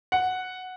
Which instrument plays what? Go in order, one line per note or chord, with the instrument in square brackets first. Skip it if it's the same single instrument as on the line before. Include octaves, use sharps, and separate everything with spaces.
[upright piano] F#5